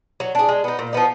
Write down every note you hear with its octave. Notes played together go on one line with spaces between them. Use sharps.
F#3
D4 G#4
G#3
B3 D#4
A#2
F3 B3 D#4